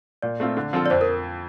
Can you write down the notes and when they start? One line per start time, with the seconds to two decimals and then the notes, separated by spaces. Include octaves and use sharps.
0.22 A#2 D5
0.40 A3 C4 F4
0.57 D3
0.73 F3 C4 F4 A4
0.86 D5
0.90 F2 C5
1.01 A#4